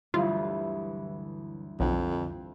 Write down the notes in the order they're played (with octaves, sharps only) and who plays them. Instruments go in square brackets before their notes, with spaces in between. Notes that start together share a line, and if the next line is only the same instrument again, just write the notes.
[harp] D2 G2 E3 [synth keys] D3 F#3 E4 [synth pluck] F4
[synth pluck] B1 [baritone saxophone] F2 [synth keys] D3